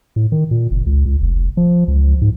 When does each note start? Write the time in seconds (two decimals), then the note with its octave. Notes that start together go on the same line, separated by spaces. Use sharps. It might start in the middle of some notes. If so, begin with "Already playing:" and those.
0.16 A2
0.32 D#3
0.51 A#2
0.71 F#1
0.86 C#2
1.05 C#2
1.21 F1
1.57 F3
1.88 C#2
2.22 G#2